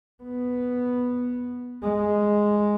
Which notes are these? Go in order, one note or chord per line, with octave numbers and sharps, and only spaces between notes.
B3
G#3